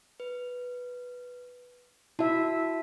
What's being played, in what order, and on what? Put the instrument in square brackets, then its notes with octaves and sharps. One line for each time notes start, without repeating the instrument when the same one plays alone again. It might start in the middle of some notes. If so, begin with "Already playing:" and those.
[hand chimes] B4
[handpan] E4 E5 [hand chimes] F#4 A5